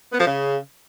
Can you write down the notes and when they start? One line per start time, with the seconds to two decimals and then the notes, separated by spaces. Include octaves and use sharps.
0.13 B3
0.20 F3
0.26 C#3